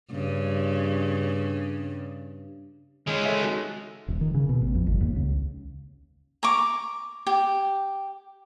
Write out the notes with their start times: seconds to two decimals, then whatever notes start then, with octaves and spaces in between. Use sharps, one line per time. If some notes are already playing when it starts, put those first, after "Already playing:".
0.11 G2 C#3
3.07 D#3 G#3 C#4
3.25 A4 C#5 E5
3.44 D#4 F#4 A4
4.08 D#1
4.21 D#3
4.34 C#3
4.49 B2
4.61 A1
4.75 F2
4.87 G1
5.01 D#2
5.16 C#2
6.43 A#5 C#6 D6
7.27 G4